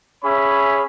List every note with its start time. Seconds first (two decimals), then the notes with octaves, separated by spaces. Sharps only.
0.24 C#4 G#4 C#5 E5 B5